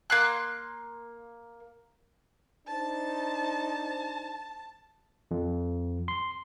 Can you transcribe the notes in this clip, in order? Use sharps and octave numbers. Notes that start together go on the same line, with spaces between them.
A#3 C6 F#6
D4 D#4 C5 A5
F2
C6